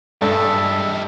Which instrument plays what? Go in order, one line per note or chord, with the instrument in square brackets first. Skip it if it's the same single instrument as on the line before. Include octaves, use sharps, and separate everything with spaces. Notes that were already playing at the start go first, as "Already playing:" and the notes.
[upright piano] G2 D5 [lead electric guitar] G3 G#3 [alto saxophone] A4 [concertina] E5